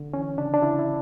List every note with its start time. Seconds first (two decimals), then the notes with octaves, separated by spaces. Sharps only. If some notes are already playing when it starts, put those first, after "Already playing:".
Already playing: D3
0.13 E3 C#4
0.37 C#3 D4
0.54 D4
0.62 C#3 E4
0.79 E4